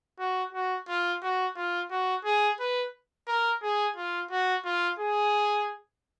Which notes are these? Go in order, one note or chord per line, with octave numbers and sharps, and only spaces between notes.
F#4
F#4
F4
F#4
F4
F#4
G#4
B4
A#4
G#4
F4
F#4
F4
G#4